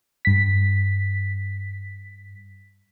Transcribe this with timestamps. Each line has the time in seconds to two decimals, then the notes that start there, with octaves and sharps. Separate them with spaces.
0.25 G2 B6